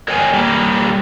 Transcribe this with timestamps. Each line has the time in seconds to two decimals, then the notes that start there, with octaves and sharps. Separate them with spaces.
0.08 A#4 C#5 D#5 G5 G#5
0.33 G3 A#3